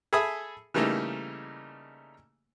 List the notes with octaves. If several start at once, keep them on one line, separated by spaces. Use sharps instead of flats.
G#4 A4 E5 G#5 B5 D#6
C#3 E3 G3 A3 A#3 D#4